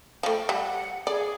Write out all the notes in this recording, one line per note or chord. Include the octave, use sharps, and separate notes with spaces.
F3 A3 G5
G3 F#5
G#4 D5